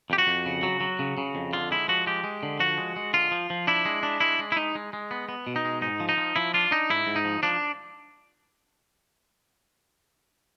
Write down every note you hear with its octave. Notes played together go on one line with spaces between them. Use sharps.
F2 G4
F#4
F2
C#3
F#3
F#3
C#3
C#3
F2
D3 F4
G#3 E4
F3 F#4
G#3 G4
G#3
D3
F3 F#4
G#3
G#3
D3 F4
F3
F3
D4 E4
G#3
D4
G#3 E4
G#3
E4
G#3 D#4
G#3
G#3
B3
B3
B2
D#4
G#3
G#2 D#4
F3
D#4
F3
F3 E4
D4 F4
D4 D#4
G#2 E4
G#2
D#4
F3
F3 D4